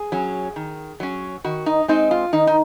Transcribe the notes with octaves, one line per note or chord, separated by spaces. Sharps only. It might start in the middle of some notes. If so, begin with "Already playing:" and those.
Already playing: G#4
F#3 C#4
D#3
F#3 C#4
D#3 F#4
D#4
G#3 C4 D#4
F4
D#3 D#4
D#4